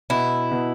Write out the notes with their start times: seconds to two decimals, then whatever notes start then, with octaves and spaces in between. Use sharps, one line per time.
0.10 B2 E4
0.51 B2